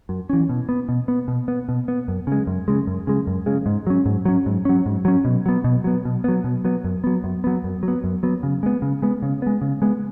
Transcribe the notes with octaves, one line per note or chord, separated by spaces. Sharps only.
F#2
E3 C#4
B2
B3
B2
B3
B2
B3
B2
B3
F#2
C#3 G#3
F#2
C#3 G#3
F#2
C#3 G#3
F#2
C#3 G#3
G#2
F#3 C#4
G#2
F#3 C#4
G#2
F#3 C#4
G#2
F#3 C#4
B2
F#3 B3
B2
F#3 B3
B2
F#3 B3
B2
F#3 B3
F#2
F#3 B3
F#2
F#3 B3
F#2
F#3
B3
F#2
F#3 B3
C#3
G#3 B3
C#3
G#3 B3
C#3
G#3 B3
C#3
G#3 B3